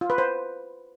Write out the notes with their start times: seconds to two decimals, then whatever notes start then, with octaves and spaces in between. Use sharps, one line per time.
0.01 F4
0.10 B4
0.18 C5